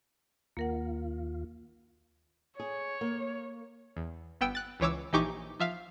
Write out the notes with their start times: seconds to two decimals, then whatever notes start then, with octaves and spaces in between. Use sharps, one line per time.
0.57 D#2 A#3 F4 A#4 F#5
2.59 G#4 C#5
3.01 A#3
3.97 E2
4.41 G1 B3 G5 E6 D7
4.55 F#6 A6
4.80 C#2 E3 C#5 D6 E6
5.13 A#1 E3 D#4 G4 C#6 D6
5.60 F3 E5 F5